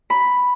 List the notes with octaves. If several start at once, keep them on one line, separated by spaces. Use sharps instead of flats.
B5